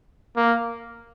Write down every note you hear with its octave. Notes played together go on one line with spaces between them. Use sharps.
A#3